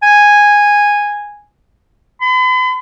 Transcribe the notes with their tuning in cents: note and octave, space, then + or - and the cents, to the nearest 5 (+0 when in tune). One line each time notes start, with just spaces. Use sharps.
G#5 -10
B5 +45